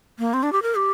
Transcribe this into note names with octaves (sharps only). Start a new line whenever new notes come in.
A#3
C4
D4
G4
A#4
G4